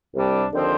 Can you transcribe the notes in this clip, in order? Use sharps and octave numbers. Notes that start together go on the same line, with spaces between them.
C2 C3 G3 D4
D#2 D3 F3 C4